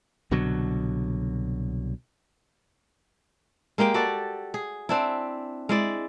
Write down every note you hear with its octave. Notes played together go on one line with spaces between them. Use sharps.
C2 B2 D3 F#3
G#3 A#3 G4 G5
F#4 G4 A4 D5
G#4
C4 D4 E4
G#3 E4 D5